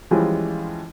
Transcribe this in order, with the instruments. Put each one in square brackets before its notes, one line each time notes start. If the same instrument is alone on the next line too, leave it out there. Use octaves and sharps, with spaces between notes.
[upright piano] E3 F3 G3 G#3 C#4 F4